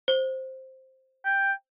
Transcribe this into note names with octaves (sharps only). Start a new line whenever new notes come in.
C5 G7
G5